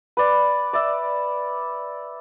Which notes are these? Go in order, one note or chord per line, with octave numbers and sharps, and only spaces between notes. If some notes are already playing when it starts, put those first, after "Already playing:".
B4 D5
D5 E5